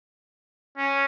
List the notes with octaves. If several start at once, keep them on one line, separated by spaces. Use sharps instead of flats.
C#4